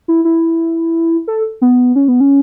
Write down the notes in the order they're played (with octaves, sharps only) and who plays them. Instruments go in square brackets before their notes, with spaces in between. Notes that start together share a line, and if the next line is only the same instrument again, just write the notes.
[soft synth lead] E4
E4
A4
B3
C#4
B3
C#4